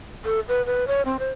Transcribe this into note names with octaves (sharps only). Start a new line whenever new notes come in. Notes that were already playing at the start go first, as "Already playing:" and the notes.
A4
B4
B4
C#5
C4
C5